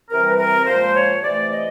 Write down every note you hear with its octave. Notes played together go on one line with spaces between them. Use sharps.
C3 E3 G3 C4 A#4
B4
A#4
A#2 F3 G#3 C5
C#5
C3 E3 A3 D5
D#5